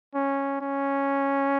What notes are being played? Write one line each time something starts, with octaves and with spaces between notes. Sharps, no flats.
C#4
C#4